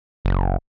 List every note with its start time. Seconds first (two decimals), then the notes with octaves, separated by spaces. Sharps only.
0.25 F#1